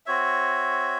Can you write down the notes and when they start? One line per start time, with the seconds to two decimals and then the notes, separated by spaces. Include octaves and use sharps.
0.06 C4 F#4 C#5 E5